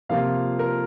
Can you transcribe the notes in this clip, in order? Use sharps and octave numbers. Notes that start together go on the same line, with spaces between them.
C3 F3 A#3 F4 F5
A#4